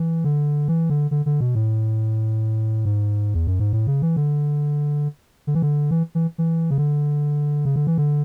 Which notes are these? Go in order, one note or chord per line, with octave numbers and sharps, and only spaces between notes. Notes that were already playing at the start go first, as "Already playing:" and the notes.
Already playing: E3
D3
E3
D3
D3
D3
B2
A2
G#2
E2
F#2
G#2
A2
C#3
E3
D3
D3
E3
D3
E3
E3
E3
C#3
D3
C#3
D3
E3
D3